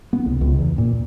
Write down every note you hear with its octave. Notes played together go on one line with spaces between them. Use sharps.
B3
C2
C#2
E2
A#2